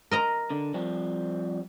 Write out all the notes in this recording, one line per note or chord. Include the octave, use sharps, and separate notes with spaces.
A#4 D#5 A#5
D3
F3 G3 C4